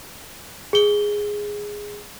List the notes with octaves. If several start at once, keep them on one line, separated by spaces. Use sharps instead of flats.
G#4 G7